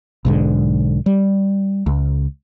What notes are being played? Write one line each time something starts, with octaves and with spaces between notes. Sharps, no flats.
B1 G#2 D3
G3
C#2